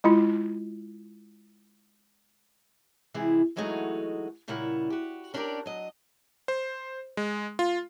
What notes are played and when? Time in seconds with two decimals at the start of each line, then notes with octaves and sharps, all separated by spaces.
0.04 G#3 E4 F4
3.14 C3 E3 G#3 E4 G#4
3.56 E3 F#3 G#3 A3 D#4 F#4
4.48 A#2 C#3 G3 A#3 E4 F#5
4.90 F#4 G4
5.34 C#4 D4 G4 A#4 B4 D5
5.66 F#3 D#5
6.48 C5
7.17 G#3
7.59 F4